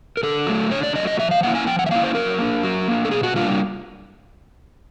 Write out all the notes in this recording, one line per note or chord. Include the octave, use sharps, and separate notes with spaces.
A#4
D3 A4
F#3 A3
D3 C#5
D5
F#3 A3 D#5
D#5
F3 E5
F5
A#3 C#4 E4 F#5
G#5
F3 G5
F#5
E5
A#3 C#4 E4 F5
C5
F#3 A#4
A#3 D4
F#3
A#3 D4
A4
B2 G#4
F#4
G3 A#3 D4 F4